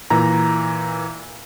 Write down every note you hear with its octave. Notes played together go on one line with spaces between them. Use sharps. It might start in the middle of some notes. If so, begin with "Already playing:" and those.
A#2 E3 A#5